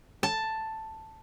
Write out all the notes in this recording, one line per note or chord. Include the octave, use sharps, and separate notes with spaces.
A5